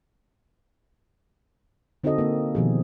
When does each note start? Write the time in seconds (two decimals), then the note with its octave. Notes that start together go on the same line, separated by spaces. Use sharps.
2.04 D3 C4 D#4 F#4 A4 D#5
2.18 A#3 C4
2.55 B2 D#3 F3 G4 G#4